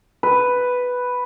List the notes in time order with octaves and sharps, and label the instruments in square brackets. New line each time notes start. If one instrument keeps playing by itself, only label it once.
[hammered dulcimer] B4